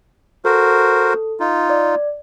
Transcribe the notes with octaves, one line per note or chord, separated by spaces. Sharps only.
F#4 A4 A#4 C5
D#4 F4
D5